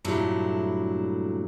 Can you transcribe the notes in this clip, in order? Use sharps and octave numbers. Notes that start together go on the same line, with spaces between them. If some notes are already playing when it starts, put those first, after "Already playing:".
G2 A#2 D3 F#3 A3 E4